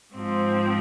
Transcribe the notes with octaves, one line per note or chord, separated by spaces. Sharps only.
G#2 F3 C4